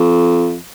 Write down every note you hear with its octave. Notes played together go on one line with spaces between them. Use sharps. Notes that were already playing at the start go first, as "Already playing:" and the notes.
Already playing: F2